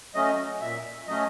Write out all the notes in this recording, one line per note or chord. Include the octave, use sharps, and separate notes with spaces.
F#3 A3 C#4 D#5
A#2 E5
F#3 A3 C#4 D#5